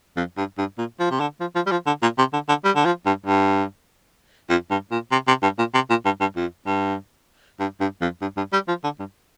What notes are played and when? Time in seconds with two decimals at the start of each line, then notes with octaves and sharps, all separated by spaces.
0.17 F2
0.37 G2
0.58 G2
0.78 A#2
0.99 F3
1.10 C3
1.20 D3
1.40 F3
1.55 F3
1.67 G3
1.71 F3
1.87 D3
2.02 A#2
2.18 C3
2.33 D3
2.49 D3
2.64 G3
2.76 D3
2.85 F3
3.06 G2
3.26 G2
4.50 F2
4.70 G2
4.91 A#2
5.12 C3
5.27 C3
5.43 G2
5.58 A#2
5.74 C3
5.90 A#2
6.05 G2
6.20 G2
6.36 F2
6.67 G2
7.60 G2
7.80 G2
8.01 F2
8.22 G2
8.37 G2
8.53 G3
8.68 F3
8.84 D3
8.99 G2